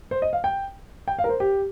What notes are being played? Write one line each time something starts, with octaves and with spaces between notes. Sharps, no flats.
C5
D#5
F5
G5
G5
F5
A#4
C5
G4